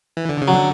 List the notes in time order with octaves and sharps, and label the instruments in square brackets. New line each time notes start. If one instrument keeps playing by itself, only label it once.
[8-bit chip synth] E3
D3
C#3
[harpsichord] F#3
[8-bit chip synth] D3